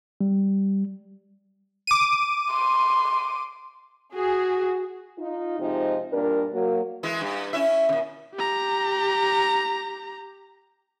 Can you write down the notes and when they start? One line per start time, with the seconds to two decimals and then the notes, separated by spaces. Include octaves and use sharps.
0.21 G3
1.87 D6 D#7
2.51 C6
4.15 F#4 G#4
5.18 D#4 F4
5.59 C3 F3 G#3 D#4
6.12 G2 A#2 D4 A#4
6.52 F#3 A#3
7.03 E3 G#3 E4
7.21 G2
7.53 C#4 E4 E5
7.89 A#2 C#3
8.34 G4 A#5